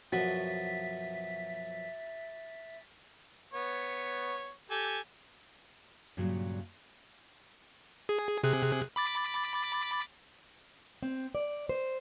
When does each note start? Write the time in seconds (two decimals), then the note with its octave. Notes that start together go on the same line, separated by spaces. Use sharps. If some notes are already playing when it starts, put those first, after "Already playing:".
0.12 F#2 B2 F3 F#4 E5 A6 B6
3.54 B3 C#5
4.70 G4 A4 G#5
6.17 G2 A#2 C#3 F#3
8.09 G#4
8.44 C3 G#4 F#6
8.96 B5 D6 A6
11.02 C4
11.35 D5
11.69 C5